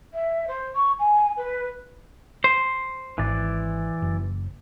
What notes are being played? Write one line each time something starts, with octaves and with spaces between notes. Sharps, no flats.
E5
C5
C#6
G#5
B4
C5
G#1 E3 D5
F#1